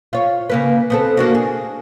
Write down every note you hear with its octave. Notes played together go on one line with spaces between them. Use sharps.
F4 C#5
C#3 A#3 B4
B3 C4 A4
A#3 D4 F#4
G#4